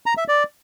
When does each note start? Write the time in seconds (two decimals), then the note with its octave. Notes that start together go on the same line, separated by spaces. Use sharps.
0.06 A#5
0.17 E5
0.28 D5